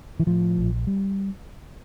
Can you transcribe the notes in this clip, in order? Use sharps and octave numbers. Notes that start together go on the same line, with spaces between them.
E3
A2 F3
A#1
G3